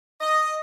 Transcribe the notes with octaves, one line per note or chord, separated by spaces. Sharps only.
D#5